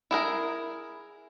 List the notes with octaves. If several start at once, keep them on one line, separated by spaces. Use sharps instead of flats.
E4 G#4 A#4